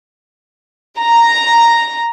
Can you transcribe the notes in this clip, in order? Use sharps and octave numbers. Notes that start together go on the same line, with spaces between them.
A#5